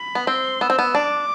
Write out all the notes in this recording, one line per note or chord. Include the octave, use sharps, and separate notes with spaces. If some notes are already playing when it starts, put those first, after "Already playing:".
Already playing: B5
B3
C4 C6
B3 E6
C4
B3
D4 D6